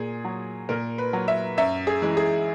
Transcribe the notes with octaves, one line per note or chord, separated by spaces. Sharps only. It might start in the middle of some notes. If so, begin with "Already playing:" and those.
Already playing: A#2 G#4
F#3
A#2 A#4
B4
F#3
E5
F#2 E5
G#4
E3 G#3
G#4